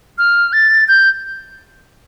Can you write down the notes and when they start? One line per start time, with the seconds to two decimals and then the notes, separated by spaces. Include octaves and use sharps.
0.18 F6
0.53 A6
0.88 G6